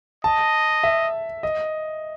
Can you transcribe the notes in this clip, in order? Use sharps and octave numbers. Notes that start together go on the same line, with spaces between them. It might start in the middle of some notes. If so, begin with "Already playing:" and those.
D#5 A5
E5
D#5